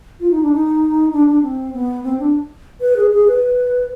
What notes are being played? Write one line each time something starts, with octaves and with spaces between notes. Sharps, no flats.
F4
D#4
D4
D#4
D4
D4
C4
B3
C4
D4
B4
G#4
G#4
B4